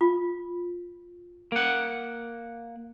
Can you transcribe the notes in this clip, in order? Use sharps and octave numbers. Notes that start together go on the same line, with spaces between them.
F4
A#3 F#5